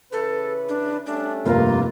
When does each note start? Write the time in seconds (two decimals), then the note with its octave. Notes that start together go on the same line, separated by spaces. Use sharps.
0.13 C#3 E3 A4 B4
0.69 D4
1.06 G3 A3 C#4 D4
1.46 F1 G2 C3 A#3 F4 A#4